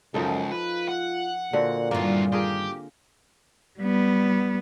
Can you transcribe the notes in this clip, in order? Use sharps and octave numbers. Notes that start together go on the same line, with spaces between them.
C#2 F#2 F3 D#4 A4
F4 B4
F#5
A#2 D3 C4 F#4
E2 G2 D#3 A#3 F4
F4 G4 G#4 A#4
G3 B3